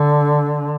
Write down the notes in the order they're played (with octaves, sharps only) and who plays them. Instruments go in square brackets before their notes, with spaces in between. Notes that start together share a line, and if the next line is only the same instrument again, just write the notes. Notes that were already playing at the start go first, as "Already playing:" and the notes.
Already playing: [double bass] D3